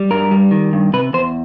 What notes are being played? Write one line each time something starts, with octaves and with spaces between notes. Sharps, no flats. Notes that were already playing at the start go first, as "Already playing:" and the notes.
Already playing: G3
G2 A#4
G3
D#3
G2
C3 B4
E2 C5